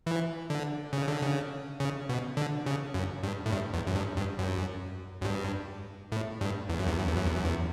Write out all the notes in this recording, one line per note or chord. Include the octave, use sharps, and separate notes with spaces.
E3
D3
C#3
D3
C#3
C#3
B2
D3
C#3
F#2
G2
A2
G2
E2
F#2
G2
G2
F#2
F#2
G2
A2
G2
E2
F#2
E2
F#2
E2
F#2
E2
F#2
E2